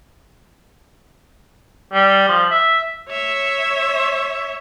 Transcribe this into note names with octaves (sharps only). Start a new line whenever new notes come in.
G3
F3
E5
C#5 E5